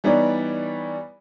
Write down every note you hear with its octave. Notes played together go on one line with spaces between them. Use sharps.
E3 G3 B3 D#4 C#5 D5